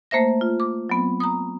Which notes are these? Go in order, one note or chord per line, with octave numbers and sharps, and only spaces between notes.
A3 A#3 C5 E5 A#6
F4
D6
F#3 B3 C4
A#5 D#6